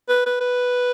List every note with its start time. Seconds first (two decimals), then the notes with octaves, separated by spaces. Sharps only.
0.09 B4
0.26 B4
0.40 B4